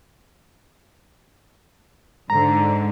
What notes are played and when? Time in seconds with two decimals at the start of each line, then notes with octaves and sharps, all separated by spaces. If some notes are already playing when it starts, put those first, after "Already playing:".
2.30 G#2 D3 A#5